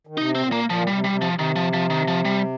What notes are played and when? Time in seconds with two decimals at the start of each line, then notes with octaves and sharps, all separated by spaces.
0.07 D#3
0.17 C3 D#4
0.35 C4
0.40 A#2
0.52 A#3
0.64 A#2
0.70 F3
0.82 D#3
0.87 C3 G3
1.04 G3
1.09 C3
1.22 F3
1.33 C3
1.39 D#3
1.56 F3
1.73 F3
1.90 D#3
2.08 F3
2.25 G3